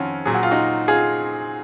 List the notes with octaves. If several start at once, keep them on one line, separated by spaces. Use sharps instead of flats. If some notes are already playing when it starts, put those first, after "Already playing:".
Already playing: F2 D#3 C#4 F4 F#4
A#2 F#3 G#4
F#4
F4
D#4 F#4
F4 G#4